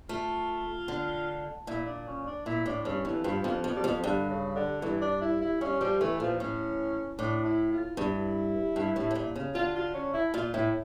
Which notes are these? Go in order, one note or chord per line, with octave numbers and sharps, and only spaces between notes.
A3 F4
D3
A#2 E4
D4
C#4
D4
A#2 E4
A2 D4
G2 C#4
F2 E3
G2 F3
F2 F3
F2 F3
G3
F2 F3
G2 D3
C#3
D3
G2 E3
D4
E4
E4
G2 C#4
F3 G3
E3 A3
A#2 F3
A2 C#4
A2 D4
E4
F4
G2 E4
G2
A2
A2
A#2
C#3
D3 F4
F4
C#4
E4
A#2 F4
A2 E4